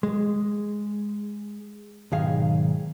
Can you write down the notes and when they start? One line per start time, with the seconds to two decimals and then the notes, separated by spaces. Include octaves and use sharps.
0.03 G#3
2.12 B1 G#2 D#3 G#4 F5